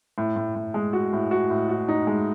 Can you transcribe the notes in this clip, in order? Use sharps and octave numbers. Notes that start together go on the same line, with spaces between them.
A2
A2
A2
G#3
F#4
A2
F#4
A2
F#4
D#4
G#3